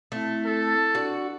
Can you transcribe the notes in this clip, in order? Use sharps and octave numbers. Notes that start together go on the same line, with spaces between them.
A3 C4 E4
A4
D4 F#4 D5